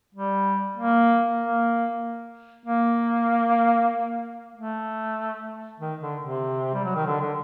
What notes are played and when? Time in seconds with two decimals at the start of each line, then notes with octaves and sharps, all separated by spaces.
0.14 G3
0.77 A#3
1.40 A#3
2.66 A#3
4.55 A3
5.80 D#3
6.01 D3
6.21 C3
6.74 G3
6.84 F#3
6.95 D#3
7.06 D3
7.21 D3